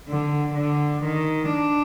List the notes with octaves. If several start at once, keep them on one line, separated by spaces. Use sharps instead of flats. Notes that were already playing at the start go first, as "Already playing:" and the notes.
D3
D3
D#3
D4